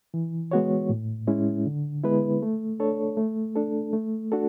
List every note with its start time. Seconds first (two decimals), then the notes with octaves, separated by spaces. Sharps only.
0.14 E3
0.51 G#3 B3 F#4 C#5
0.89 A2
1.27 G#3 C#4 E4
1.66 D3
2.04 G#3 B3 E4 B4
2.42 A3
2.80 D4 A4 C#5
3.17 A3
3.56 D4 A4
3.93 A3
4.32 D4 F#4 A4